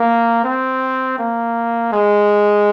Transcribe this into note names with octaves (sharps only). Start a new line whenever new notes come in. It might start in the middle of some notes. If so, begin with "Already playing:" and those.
Already playing: A#3
C4
A#3
G#3